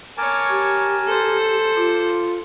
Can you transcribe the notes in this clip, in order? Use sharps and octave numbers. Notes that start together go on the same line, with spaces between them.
A#4 C#5 G#5 A5 D6
G4
A4 C5
F4 D6